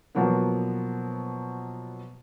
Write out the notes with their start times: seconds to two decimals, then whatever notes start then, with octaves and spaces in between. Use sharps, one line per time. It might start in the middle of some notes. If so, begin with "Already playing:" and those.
0.15 B2 F3 F#3 A#3 B3